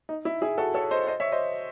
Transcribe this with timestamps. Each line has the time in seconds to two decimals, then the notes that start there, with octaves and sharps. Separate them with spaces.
0.09 D#4
0.25 E4
0.42 E4 G#4
0.58 F#4 A4
0.74 A4 C#5
0.91 C5 D#5
1.07 C5 D#5
1.20 C#5 E5
1.32 C5 D#5